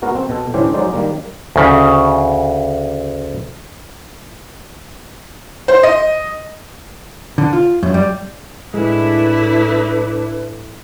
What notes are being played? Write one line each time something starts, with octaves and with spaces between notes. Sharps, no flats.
G#3 B3 F#4 A#4
C4
B2 A4
A2 D3 E3 C#4 G4 C5
F#3 G#3 D#4 C5 D5
D#3 G3 A#3
D2 C#3
C5
D#5
D3
F4
F#2
G3
A2 G#3 A3 D4 E4 B4